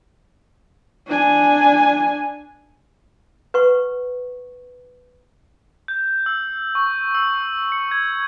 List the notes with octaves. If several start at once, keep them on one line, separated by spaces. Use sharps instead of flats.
D4 G#5
B4 F#5 C#6
G6
E6
C#6
E6
C#7
G#6